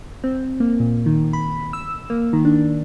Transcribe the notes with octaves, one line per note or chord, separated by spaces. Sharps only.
C4
A#3
A#2
D#3
B5
E6
A#3
D#3
D4